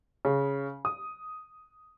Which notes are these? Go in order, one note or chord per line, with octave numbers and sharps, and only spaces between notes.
C#3
D#6